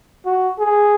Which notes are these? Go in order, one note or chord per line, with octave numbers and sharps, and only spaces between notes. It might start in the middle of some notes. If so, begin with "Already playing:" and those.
F#4
G#4